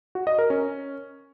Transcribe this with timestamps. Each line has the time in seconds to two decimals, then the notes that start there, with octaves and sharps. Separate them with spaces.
0.15 F#4
0.27 D#5
0.38 A#4
0.50 C#4